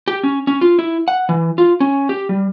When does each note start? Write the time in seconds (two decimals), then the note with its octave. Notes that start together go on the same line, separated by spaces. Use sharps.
0.08 G4
0.23 C#4
0.47 C#4
0.61 F4
0.79 E4
1.08 F#5
1.29 E3
1.58 F4
1.80 C#4
2.09 G4
2.29 G3